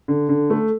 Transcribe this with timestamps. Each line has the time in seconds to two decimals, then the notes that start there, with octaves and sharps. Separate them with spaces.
0.08 D3
0.29 D3
0.50 A3